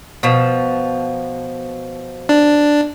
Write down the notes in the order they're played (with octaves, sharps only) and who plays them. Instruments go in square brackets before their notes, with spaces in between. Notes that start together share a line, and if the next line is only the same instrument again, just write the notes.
[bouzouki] B2 F3
[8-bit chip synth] D4